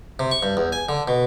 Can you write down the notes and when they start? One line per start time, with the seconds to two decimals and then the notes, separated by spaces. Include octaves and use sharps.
0.19 C3
0.31 C#6
0.43 G2
0.57 E2
0.72 G#5
0.89 D3
1.08 B2